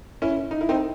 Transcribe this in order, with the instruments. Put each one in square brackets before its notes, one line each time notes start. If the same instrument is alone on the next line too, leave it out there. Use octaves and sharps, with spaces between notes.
[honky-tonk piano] C#4 E4
D#4
E4
C4 D#4